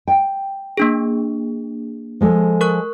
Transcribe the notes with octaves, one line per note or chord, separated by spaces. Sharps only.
G5
A#3 D4 G#4
F3 G#3 A4
A#4 C#6 F#6